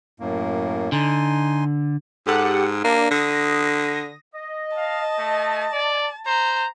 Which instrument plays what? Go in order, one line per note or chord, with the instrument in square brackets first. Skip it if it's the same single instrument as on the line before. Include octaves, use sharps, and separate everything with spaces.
[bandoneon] F#2 A2 A#3
[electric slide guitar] D3 [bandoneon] D#4 G#5 C6
[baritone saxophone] G#2 [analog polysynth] G4 A4 F#5
[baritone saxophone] A#3 [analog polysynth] D4
[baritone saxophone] D3 [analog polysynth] D#6 A#6
[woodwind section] D#5
[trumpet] F5 [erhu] A5
[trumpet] A3
D5
[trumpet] C5 [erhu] A#5